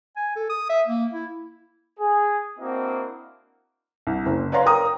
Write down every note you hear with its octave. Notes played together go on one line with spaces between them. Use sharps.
G#5
A4
D#6
E5
A#3
E4
G#4
A#3 C4 D4 E4 F#4 D#5
C2
F#1
B4 C#5 D5 F5 A#5 C6
A#4 G5 A#5 D#6